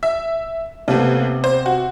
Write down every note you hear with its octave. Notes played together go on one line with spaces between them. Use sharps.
E5
D#2 C3 A3 B3
C5
F#4